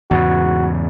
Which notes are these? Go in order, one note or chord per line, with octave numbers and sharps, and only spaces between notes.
E2 G#2 C#3 F#4